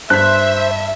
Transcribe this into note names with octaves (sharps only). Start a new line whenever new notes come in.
G2 C5 E5 F#6 B6